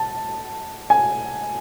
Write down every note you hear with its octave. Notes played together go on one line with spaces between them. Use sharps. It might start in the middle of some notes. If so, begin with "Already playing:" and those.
Already playing: A5
G#5